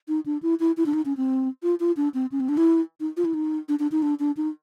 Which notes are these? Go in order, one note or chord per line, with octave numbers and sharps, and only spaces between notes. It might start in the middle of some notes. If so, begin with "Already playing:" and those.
D#4
D4
E4
E4
E4
D4
D#4
C#4
C4
F4
F4
D4
C4
C#4
C4
D4
E4
D#4
F4
E4
D#4
D4
D4
D#4
D4
D4
D#4